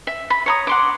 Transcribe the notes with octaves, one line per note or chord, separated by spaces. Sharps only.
E5
B5
C#5 A#5 D#6
F#5 C6 D6